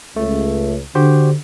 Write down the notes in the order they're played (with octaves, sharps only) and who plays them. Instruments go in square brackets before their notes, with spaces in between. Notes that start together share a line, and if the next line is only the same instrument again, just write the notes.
[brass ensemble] C#2 [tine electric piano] A3
[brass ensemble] D3 [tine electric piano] F#4 G4 C5